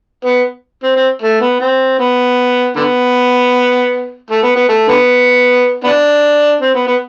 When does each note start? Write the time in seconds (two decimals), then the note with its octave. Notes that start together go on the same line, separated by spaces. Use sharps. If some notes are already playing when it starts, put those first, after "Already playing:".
0.25 B3
0.83 C4
0.96 C4
1.22 A3
1.41 B3
1.60 C4
1.99 B3
2.76 D3 B3
4.30 A3
4.43 B3
4.56 B3
4.69 A3
4.88 D3 B3
5.84 B3 D4
6.61 C4
6.74 B3
6.87 B3